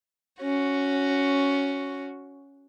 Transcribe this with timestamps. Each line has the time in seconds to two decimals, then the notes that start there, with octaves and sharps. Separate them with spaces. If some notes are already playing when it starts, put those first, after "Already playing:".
0.41 C#4 F#4